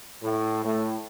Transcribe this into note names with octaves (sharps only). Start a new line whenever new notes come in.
A2
A2